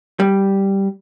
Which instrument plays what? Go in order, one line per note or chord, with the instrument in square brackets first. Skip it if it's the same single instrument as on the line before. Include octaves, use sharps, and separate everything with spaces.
[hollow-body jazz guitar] G3